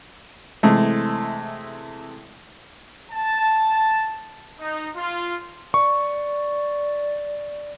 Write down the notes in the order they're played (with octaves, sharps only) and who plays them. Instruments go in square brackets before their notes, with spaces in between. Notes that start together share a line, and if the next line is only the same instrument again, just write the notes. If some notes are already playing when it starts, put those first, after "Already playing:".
[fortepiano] C3 E3 G#3 A3
[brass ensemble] A5
D#4
F4
[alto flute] D5 [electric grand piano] C#6